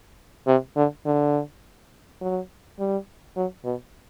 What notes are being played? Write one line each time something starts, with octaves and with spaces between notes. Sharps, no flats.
C3
D3
D3
F#3
G3
F#3
B2